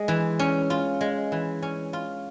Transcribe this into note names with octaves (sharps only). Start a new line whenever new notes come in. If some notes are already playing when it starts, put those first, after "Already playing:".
Already playing: G#3
E3
C#4
F4
G#3
E3
C#4
F4